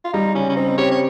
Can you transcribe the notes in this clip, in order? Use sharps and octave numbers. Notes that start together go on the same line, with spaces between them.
F4
G3 D#4
C#3 C#4
C#4
C4 D#4
G4 C#5
C#5